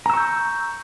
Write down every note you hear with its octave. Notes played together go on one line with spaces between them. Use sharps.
A#5 C#6 E6 G6